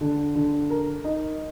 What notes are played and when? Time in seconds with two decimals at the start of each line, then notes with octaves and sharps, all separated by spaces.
0.01 D3
0.35 D3
0.70 A#4
1.04 D#4